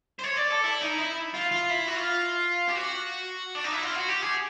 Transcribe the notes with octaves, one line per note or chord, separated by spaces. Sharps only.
C5
C#5
D5
A4
E4
D#4
E4
F4
F4
E4
F#4
F4
G4
F#4
D4
D#4
E4
F4
F#4
G4
G#4